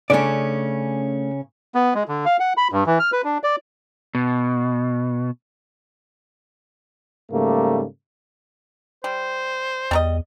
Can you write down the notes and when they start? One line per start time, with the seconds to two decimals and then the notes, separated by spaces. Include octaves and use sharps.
0.10 C#3 A3 C#4 D4 D5
1.75 B3
1.95 G#3
2.08 D3
2.25 F5
2.40 F#5
2.57 B5
2.72 G2
2.86 E3
2.99 F6
3.12 B4
3.24 D4
3.44 D5
4.15 B2
7.31 G#2 C#3 G3 A3 A#3
9.04 G3 C5
9.91 E2 G3 A#4 D#5